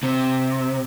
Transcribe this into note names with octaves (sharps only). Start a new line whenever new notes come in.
C3